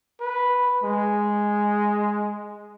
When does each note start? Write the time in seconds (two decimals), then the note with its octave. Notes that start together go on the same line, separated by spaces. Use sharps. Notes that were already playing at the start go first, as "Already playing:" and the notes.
0.21 B4
0.84 G#3